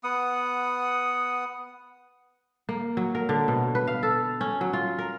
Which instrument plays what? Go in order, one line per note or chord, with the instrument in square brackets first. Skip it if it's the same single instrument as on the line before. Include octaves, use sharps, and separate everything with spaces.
[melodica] B3 F#5 D#6
[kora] A#3
F#3
A#4
D3
B2
B4
F5
A4
C#4
F#3
F4
A#4